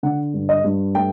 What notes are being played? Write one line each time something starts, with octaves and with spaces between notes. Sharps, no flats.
D3 F#5
G2
D#5
G2
A3 G5